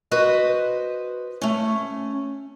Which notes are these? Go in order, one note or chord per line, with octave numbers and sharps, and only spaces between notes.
F#4 B4 C5 D#5
A3 C#4